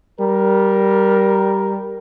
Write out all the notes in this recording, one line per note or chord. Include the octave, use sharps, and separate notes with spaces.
G3 A#4